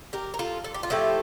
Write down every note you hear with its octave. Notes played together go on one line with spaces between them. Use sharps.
G4 A#4
A#4
F4 A4
A4
G4
F4
A2 F3 A3 E4 G4